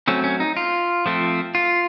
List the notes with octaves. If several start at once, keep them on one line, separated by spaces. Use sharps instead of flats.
F#3 A3 C4 C#4
C#4
D#4
F4
F3 A3 C4
F4